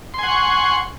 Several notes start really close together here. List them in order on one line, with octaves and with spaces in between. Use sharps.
C6 G#5 F#5 C#6